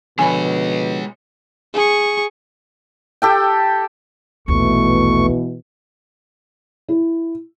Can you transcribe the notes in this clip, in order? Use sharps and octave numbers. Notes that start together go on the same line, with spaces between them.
B2 D3 F3 G#3 C#5 G#5 B5
G#4 C#6
G4 A4 G5
A#1 D#2 B2 E3 A3 C#6
E4